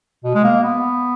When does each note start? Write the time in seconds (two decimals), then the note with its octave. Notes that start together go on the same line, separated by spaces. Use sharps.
0.24 B2
0.35 G#3
0.44 A#3
0.63 B3